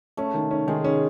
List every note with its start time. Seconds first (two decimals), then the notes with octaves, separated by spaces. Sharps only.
0.17 A3 C#4
0.34 D#3
0.51 C#4
0.68 D#3 G#3
0.84 C#4